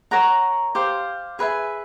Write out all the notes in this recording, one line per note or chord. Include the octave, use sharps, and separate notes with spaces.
A#4 C#5 F#5 A#5
G4 C5 F5
G#4 B4 E5 G#5